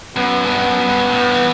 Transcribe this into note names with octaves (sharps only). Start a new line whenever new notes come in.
F#2 B3
G2 B3
F#2
G2
A2
E3